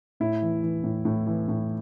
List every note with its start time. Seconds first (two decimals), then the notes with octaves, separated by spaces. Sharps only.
0.20 A2 E4
0.42 E3
0.63 E3
0.84 A2
1.05 A2
1.27 E3
1.48 A2